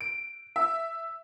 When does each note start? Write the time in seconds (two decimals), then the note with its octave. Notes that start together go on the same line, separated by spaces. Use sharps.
0.01 D7
0.56 E5